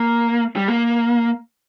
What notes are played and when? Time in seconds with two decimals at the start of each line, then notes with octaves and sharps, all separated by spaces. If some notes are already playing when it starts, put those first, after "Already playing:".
Already playing: A#3
0.56 G3
0.68 A#3